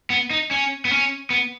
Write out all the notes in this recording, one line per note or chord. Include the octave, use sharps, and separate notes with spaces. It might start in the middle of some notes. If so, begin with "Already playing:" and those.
B3
D#4
C#4
B3
C#4
B3